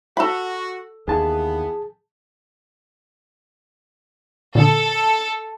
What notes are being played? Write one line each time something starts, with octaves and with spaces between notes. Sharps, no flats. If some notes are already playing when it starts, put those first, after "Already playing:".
F#4 A4 B5
D#2 E3 B3 G#4 A5
A#2 D3 A4